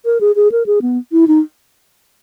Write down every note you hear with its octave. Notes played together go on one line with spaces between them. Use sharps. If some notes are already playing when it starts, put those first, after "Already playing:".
A#4
G#4
G#4
A#4
G#4
B3
E4
D#4